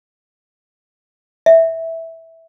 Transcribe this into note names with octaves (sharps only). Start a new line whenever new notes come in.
E5